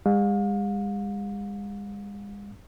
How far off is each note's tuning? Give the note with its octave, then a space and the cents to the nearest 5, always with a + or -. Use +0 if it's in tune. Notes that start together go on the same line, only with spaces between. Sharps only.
G#3 -40 F5 +40